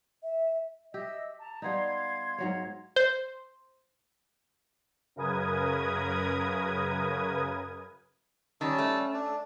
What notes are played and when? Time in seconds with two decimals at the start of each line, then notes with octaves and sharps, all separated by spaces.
0.23 E5
0.94 G4 D#5 E5 E6
1.40 A5 A#5
1.62 G3 B3 D#4 F5 C6 G#6
2.38 G#2 F#3 C#5
2.96 C5
5.16 F#2 C#3 A#4 B4 D#6 G#6
8.61 D#3 G3 C#4 A5 E6
8.78 A3
9.13 D4